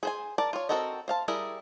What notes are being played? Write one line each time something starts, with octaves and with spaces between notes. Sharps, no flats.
G#4 C5 G#5
A#4 D5 A5
F4 C#5
C4 F#4 A4 A#4 D#5
C5 F5 A5
G3 E4 G#4 A#4